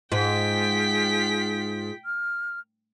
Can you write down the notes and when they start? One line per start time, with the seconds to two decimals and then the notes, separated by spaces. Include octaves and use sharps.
0.12 G#2 F4 G#4 G5 B6
2.05 F6